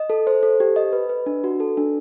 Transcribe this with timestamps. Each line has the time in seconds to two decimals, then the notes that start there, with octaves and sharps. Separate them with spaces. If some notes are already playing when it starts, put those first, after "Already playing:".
Already playing: D#5
0.10 A4
0.27 C5
0.43 A4
0.60 G4
0.76 D#5
0.93 B4
1.09 B4
1.26 D4
1.44 F#4
1.60 A4
1.77 D4